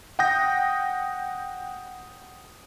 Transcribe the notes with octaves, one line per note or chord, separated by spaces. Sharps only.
F#5 G5 D#6 G6 A#6